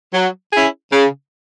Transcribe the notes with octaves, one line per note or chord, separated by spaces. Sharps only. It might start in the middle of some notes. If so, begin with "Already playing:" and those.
F#3
C#4 E4 G#4
C#3